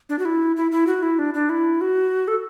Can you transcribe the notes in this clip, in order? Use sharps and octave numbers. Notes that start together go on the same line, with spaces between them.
D4
F#4
E4
E4
E4
F#4
E4
D4
D4
E4
F#4
A4